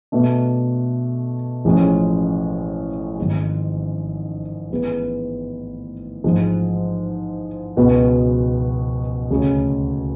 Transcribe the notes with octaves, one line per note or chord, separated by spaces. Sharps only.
B2 A3 D4
A1 A2 F3 G#3 C#4
G#1 G#2 G#3
A1 A2 G#3 B3
A1 G#2 F3 G#3
C#2 B2 G#3 B3 F#4
D2 C#3 G#3 C#4 G#4